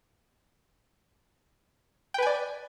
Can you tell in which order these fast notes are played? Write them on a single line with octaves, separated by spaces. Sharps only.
G5 B4 G#5 D5